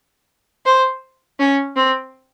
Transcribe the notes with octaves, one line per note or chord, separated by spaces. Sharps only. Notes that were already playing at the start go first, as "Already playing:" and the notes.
C5
C#4
C4